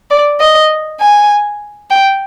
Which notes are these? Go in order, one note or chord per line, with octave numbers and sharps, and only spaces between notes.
D5
D#5
G#5
G5